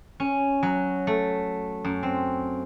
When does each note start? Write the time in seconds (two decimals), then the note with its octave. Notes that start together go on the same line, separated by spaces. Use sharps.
0.20 C#4
0.63 F#3
1.07 A3
1.85 F#2
2.03 C4